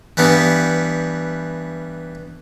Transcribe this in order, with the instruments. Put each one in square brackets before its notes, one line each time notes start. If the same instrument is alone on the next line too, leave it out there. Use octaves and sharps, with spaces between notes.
[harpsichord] G2 E3 G3 B3